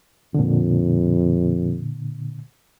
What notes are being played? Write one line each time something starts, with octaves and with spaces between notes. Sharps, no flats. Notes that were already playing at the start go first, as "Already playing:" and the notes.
F2 A#2 D3